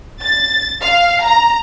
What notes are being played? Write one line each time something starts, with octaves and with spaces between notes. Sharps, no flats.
A6
F5
A#5